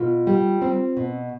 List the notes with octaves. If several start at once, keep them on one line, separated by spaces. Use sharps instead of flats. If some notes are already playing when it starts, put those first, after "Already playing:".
Already playing: B2 F4
G3
C4
B2